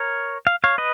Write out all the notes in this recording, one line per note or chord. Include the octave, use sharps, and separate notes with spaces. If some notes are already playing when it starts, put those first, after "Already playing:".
Already playing: A#4 C#5
F5
C#5 F5
B4 D#5